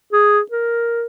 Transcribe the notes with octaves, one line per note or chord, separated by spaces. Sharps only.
G#4
A#4